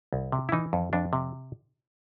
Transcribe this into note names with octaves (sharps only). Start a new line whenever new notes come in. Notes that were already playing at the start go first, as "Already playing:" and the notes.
C2
C3
E4
E3 D#4
F2
F2 D4
C3